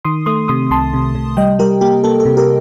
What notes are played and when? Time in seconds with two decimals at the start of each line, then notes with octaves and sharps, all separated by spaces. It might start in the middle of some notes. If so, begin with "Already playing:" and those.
0.05 D#3 C6 D#6
0.26 A3 C6 D#6
0.48 C3 C6 D#6
0.70 C2 A5 C6
0.93 C3
1.15 C3
1.37 G3 D#5 G5
1.59 G3 G4 A#4
1.81 A#3 G4
2.04 A#3 A4
2.20 A4
2.25 C3
2.37 G4 A#4